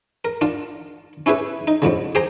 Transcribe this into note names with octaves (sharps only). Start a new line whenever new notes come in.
A#4
D4 F4
C#4 E4 G4 G#4 B4
D#4
A#1 F2 A2 C#3
G4 G#4 C5 G5 A#5